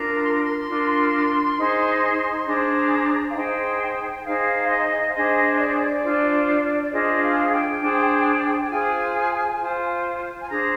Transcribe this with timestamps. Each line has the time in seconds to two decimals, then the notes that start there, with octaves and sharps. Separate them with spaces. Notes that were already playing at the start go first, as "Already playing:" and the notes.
Already playing: D4 F4 A#4 A#5
0.23 C6
0.34 A#5
0.43 C6
0.68 D4 F4 A#4
1.57 D#4 G#4 C5
2.46 D4 G#4 C5 A#5
3.29 F5
3.35 D#4 G#4 C5 G5
4.24 D#4 G#4 C5 F5
4.69 D#5
5.08 F5
5.13 D4 G#4 C5 D#5
5.52 D#5
5.58 D5
6.03 D4 F4 C5
6.82 D5
6.92 D4 F4 G#4 C5 D#5
7.22 F5
7.52 G5
7.81 D4 G#4 C5
8.62 G5
8.70 F4 G#4 C5 G#5
9.60 F4 C5
10.40 G#5
10.49 D4 G#4 C5 A#5